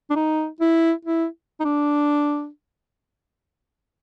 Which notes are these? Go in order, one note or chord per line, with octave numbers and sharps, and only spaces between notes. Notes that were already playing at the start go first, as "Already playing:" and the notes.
D4
D#4
E4
E4
D#4
D4